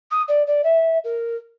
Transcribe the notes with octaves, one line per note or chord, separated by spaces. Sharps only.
D#6
D5
D5
E5
A#4